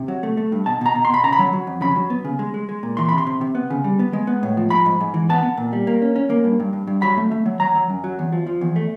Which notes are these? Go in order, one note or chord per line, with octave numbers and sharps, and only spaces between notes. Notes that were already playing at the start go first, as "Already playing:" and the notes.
Already playing: C3
F#3
A3
A3
G2
B2 A5
B2 A#5
B2
C6
B2 B5
C#3 A#5
B5
F#3
F#3
F2
C#3 B5
F#3
B3
C#3
G#3
G#3
G#3
A#2
E3 C6
C3 B5
C6
C3
C3
B3
C#3
G3
B3
G#3
B3
A2
F3
G#2 B5
G#2
G#2
E3
B3 A5
B3
A#2
G3
A#3
C#4
C#4
A#3
G2
G2
G2
G2
F#3 B5
A3
A3
F#3
F#3 A#5
F#3
F#2
F#3
E2
F3
F3
E2
A3